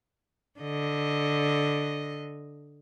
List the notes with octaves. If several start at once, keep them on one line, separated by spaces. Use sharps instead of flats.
D3 D#5